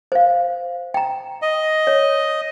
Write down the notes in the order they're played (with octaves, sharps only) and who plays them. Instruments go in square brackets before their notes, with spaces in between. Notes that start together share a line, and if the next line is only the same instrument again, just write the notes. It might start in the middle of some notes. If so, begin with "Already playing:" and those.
[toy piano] C5 F5
G5 A#5
[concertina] D#5
[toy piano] C#5